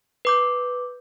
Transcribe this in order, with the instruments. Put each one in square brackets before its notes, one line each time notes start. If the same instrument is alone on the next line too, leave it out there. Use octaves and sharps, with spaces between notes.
[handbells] B4 D6 G6